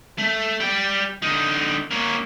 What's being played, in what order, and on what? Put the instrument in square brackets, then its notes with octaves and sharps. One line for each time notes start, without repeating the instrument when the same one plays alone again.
[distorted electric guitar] A3
G3 G5
D3 D#4
A#3 C#4